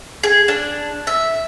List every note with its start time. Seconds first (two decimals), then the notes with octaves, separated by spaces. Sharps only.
0.23 G#4
0.48 D4
1.07 E5